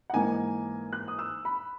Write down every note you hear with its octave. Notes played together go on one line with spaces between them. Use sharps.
F#5
G#2 E3 A#3 D#4 G#5
F#6
D#6
E6
B5